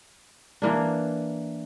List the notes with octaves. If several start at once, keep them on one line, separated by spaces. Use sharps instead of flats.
E3 A#3 D4